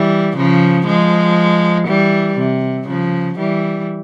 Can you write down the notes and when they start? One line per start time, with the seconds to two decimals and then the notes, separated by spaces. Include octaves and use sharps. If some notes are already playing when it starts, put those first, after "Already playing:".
Already playing: E3 G3
0.37 C#3 F3
0.87 F3 G#3
1.87 E3 G3
2.38 C3
2.87 C#3 F3
3.38 E3 G3